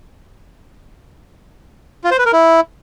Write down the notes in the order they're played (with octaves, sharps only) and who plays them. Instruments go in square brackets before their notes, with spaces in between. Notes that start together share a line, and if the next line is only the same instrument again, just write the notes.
[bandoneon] F4
C5
B4
A#4
E4